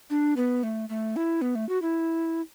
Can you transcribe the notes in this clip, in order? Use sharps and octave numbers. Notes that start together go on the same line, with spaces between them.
D4
B3
A3
A3
E4
B3
A3
F#4
E4